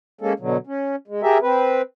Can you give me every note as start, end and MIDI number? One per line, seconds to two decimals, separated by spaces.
0.21 0.33 56
0.21 0.33 58
0.21 0.33 61
0.21 0.33 69
0.40 0.57 47
0.40 0.57 50
0.40 0.57 54
0.67 0.96 61
1.08 1.22 56
1.22 1.38 67
1.22 1.38 68
1.22 1.38 70
1.22 1.38 76
1.42 1.82 60
1.42 1.82 71